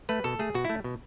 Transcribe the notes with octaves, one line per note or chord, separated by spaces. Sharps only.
A3 B4
B2 A4
A3 G#4
B2 F#4
A3 E4
B2